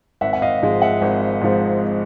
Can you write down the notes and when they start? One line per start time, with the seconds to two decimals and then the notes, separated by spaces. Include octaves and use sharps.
0.21 G#1 E5 F#5
0.33 F#5
0.42 D#5 F5
0.62 G#2 F3 G#3
0.82 E5 F#5
1.02 G#1
1.42 G#2 F3 G#3